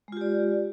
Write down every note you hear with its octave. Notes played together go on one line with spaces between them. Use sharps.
G#3 F4 G4 D5